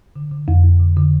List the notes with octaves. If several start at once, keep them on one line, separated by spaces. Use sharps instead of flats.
D3
D3
F2
F2
D3
D3